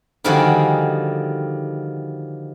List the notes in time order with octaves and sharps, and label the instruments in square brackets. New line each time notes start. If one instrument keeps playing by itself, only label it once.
[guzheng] D3 D#3 F3 G3 F#4 G#4